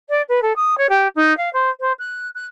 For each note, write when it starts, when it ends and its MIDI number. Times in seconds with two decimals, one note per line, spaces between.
0.09 0.21 74
0.28 0.40 71
0.42 0.52 69
0.56 0.77 87
0.77 0.87 73
0.89 1.07 67
1.15 1.35 63
1.37 1.49 77
1.53 1.69 72
1.80 1.92 72
1.99 2.29 90
2.35 2.45 90